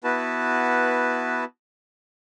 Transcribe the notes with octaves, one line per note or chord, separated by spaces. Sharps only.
B3 E4 F#4 B4 A5